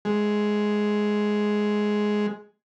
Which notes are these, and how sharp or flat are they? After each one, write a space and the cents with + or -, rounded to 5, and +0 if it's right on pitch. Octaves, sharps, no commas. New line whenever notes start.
G#3 +5